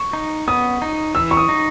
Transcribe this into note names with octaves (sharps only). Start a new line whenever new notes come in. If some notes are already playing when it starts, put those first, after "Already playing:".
Already playing: C#6
D#4
B3 D#6
D#4
E3 E6
C#6
D#6
D#4